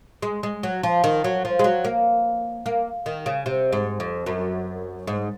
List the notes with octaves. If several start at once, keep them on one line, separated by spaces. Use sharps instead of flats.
G#3
G#3
F#3
F3
D#3
F#3
F3
G#3
F#3
A#3
A#3
D#3
C#3
C3
G#2
F2
F#2
G#2